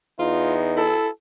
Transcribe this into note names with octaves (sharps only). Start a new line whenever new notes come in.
E2 D#4 F4
E4 A4